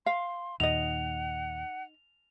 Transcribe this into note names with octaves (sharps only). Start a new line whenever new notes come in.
F5 C6
D#2 A#2 D#4 D#5 F#5 F7